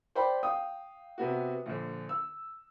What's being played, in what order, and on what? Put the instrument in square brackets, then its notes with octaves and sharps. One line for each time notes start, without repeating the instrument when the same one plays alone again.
[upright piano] C5 D5 G5 B5
F5 G5 D#6
C3 B3 F#4
A#1 D3
E6